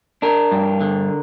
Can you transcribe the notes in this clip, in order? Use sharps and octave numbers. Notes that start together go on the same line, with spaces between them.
D4 A#4
G2
D3